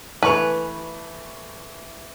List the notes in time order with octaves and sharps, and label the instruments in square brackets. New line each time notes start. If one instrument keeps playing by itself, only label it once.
[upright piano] E3 A3 [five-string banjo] B4 [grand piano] G#5 C#6 F7